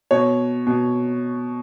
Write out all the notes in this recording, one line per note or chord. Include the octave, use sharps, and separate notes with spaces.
B2 C#5
B2